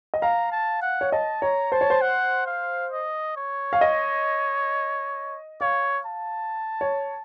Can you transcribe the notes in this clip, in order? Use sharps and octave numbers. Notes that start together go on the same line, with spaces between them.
D#5
F5 A#5
A5
F#5
C#5
D#5 A5
C#5 A#5
C5 A5
C#5
C5
F#5
F5
D#5
C#5
F5
D#5
C#5 F5
A5
C#5